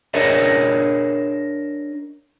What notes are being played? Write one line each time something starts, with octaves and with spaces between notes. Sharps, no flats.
D4 G#4 A#4 C#5 D#5 E5